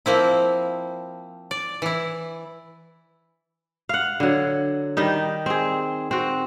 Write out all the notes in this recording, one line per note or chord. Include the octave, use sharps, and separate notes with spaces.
F3 A#3 C4 E4
D5
E3 E4
F5 F#5
D3 F#3
D#3 G3 D#4
C4 G#4
C4 F#4